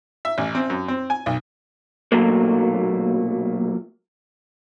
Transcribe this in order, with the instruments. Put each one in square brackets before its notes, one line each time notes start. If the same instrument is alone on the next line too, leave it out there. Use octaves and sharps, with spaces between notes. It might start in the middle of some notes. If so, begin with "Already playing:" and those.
[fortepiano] E5
A1
C4
F#2
C4
G#5
B1
[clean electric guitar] B1 A#2 F#3 A3 A#3